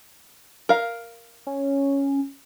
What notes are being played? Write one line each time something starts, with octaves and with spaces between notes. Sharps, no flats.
A#4 F5
C#4